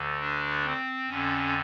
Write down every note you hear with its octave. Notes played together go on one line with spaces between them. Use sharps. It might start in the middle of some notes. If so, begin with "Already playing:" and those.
Already playing: D2 D3
D4
C4
F2 D3 C#4